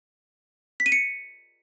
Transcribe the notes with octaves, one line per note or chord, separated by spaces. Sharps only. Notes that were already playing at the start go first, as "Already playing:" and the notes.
B6
D#7
C#7